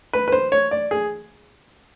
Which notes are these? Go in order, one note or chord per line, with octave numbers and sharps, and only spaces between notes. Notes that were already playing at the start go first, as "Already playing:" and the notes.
B4
B4
C5
C#5
D5
G#4